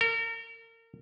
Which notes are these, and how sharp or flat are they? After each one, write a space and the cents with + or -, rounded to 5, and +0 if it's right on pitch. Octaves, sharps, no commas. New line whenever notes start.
A#4 -35